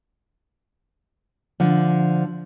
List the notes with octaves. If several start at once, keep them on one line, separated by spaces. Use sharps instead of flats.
D3 F3